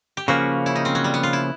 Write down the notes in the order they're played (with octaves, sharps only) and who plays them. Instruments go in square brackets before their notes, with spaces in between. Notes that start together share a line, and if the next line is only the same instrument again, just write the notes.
[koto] G4
[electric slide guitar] C#3 F3 A#3 C#4 [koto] F#4
[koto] E4
D#4
C4
F#3
G3
B3
F4
E4